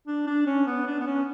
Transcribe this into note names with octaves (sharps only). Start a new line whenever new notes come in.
D4
D4
C#4
B3
D4
B3
C#4